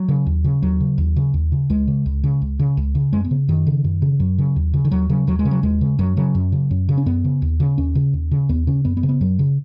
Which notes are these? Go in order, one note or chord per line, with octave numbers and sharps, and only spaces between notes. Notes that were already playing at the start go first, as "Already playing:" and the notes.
Already playing: F#3
C#3
D#2
C#3
D#2 F#3
C#3
D#2
C#3
D#2
C#3
C#2 G#3
C#3
C#2
C#3
C#2
C#3
C#2
C#3
F#2 G#3
B3
C#3
F#2 D#3
C#3
F#2
C#3
F#2 F#3
C#3
D#2
C#3
D#3
D#2 F#3
C#3 F#3
D#2 F#3
G#3
C#3
F#3
D#2 G#3
C#3
F#2 F#3
C#3 F#3
F#2
C#3
F#2
C#3
C#4
F#2 B3
C#3
D#2
C#3
D#2 C#4
C#3
D#2
C#3
D#2 B3
C#3 C#4
F#2 B3
B3
C#3
B3
F#2 F#3
C#3